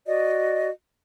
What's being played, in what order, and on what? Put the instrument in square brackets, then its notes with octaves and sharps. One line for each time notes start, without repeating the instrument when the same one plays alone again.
[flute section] F#4 D5 D#5